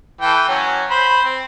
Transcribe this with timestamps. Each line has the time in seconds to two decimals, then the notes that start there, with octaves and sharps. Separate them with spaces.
0.21 E3 A4 G5
0.49 F#3 C#4 F#4
0.90 C5 B5
1.24 C4